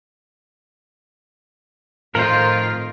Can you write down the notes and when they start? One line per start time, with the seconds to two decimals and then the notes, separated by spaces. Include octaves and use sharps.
2.15 F2 A2 D#3 F4 A#4 C5